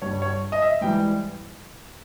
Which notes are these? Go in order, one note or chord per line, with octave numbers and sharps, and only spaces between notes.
G2 G3 C#5
C#5
D#5
E5
G#2 E3 G3 G5